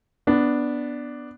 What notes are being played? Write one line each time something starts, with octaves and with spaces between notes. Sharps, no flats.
B3 D4